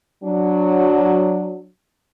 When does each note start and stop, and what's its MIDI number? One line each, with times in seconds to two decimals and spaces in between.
0.24 1.65 54
0.24 1.65 62